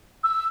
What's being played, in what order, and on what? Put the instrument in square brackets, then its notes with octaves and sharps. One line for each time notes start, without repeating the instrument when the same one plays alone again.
[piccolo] E6